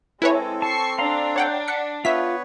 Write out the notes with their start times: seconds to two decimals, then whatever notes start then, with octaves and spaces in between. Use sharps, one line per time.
0.22 G#3 C4 E4 A4 B4 C#5
0.62 A5 C#6 C7
0.98 D4 F5 A#5 C6
1.36 C#5 F#5 G5
1.68 F#5 B6 C#7
2.05 B3 F4 B4 C#5 E5 B6